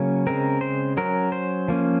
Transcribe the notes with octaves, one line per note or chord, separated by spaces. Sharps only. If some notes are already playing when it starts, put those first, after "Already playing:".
Already playing: C#3 F#3 A#3 C#4
C#3 G#3 C4 A#4
C5
F#3 C#4 A#4
C5
F3 A#3 C#4